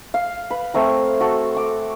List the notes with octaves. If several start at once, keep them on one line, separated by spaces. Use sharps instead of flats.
F5
B4
A3 C4 A#4
F#4 A4
D6